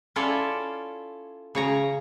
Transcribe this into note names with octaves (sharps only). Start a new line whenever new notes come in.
C#4 E4 F4 A4 C#5 D5
C#3 C#5 A#5